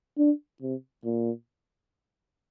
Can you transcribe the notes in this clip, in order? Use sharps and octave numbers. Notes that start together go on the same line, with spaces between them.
D4
C3
A#2